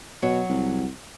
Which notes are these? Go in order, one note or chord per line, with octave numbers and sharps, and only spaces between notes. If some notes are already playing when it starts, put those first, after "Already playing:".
B2 F#3 C#5
C2